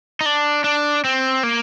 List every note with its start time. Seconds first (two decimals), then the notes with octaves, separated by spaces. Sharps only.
0.21 D#4
0.26 D4
0.64 D4
1.04 C4
1.43 A#3